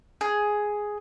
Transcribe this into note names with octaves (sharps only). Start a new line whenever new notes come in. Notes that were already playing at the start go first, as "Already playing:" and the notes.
G#4